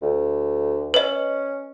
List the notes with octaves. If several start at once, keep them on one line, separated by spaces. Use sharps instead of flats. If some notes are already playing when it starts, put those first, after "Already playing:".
D2
C#4 B4 D#5